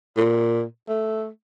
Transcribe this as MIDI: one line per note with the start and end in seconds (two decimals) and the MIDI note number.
0.17 0.63 46
0.88 1.28 57